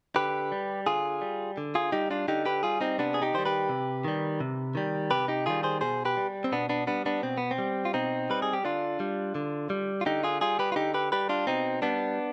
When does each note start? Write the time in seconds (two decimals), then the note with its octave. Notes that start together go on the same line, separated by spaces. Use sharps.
0.16 D3 G4 B4
0.52 G3
0.86 D3 F4 G#4
1.21 G3
1.57 D3
1.75 F4 G#4
1.92 G3 D#4 G4
2.11 D4 F4
2.28 D3 D#4 G4
2.45 G4 B4
2.63 G3 F4 G#4
2.81 C4 D#4
2.98 C3 B3 D4
3.14 G#4
3.22 D#4 G4
3.34 D#3 G3 C5
3.46 G4 B4
3.69 C3
4.04 D#3 G3
4.40 C3
4.75 D#3 G3
5.11 C3 G4 B4
5.28 D#4 G4
5.46 D#3 G3 F4 G#4
5.63 G#4 C5
5.81 B2 G#4 C5
6.05 G4 B4
6.17 G3
6.44 C4
6.52 B2 B3 D4
6.69 B3 D4
6.87 G3 B3 D4
7.06 B3 D4
7.23 B2 C4
7.38 B3
7.51 C4
7.58 G3
7.85 F4
7.93 B2 C4 D#4
8.30 G3 B4
8.42 G#4
8.53 G4
8.64 D3 D4 F4
9.00 G3
9.35 D3
9.70 G3
10.01 F4
10.06 D3 D#4 G4
10.23 F4 G#4
10.41 G3 F4 G#4
10.59 G4 B4
10.72 F4
10.76 D3 D#4 G4
10.94 G4 B4
11.12 G3 G4 B4
11.29 D4 F4
11.47 B2 C4 D#4
11.82 G3 B3 D4